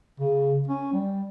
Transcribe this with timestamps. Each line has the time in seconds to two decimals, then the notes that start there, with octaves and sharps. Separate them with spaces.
0.20 C#3
0.68 C#4
0.92 G3